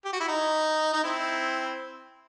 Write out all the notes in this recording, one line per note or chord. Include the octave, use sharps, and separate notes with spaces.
G4
F#4
E4
D#4
D#4
C4 E4